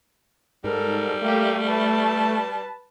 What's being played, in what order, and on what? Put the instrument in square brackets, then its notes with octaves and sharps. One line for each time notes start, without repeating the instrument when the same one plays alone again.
[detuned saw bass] G#2 [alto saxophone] G3 [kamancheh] A4 A#4
[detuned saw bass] A3 [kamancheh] A#3 G4
[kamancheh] B4 A5